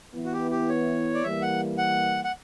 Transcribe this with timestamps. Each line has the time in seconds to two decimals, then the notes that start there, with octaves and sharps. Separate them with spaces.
0.15 E3 B3 E4
0.25 F#4
0.33 G4
0.51 G4
0.69 C#5
1.14 D5
1.23 E3 G3 A#3 E5
1.42 F#5
1.78 F#5
2.24 F#5